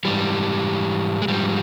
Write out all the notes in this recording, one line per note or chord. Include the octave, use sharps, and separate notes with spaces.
G#2 E3 G3
G#3
G#2 F3 G3